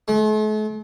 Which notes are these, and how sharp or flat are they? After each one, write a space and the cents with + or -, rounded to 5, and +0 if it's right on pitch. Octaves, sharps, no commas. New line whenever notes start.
A3 -45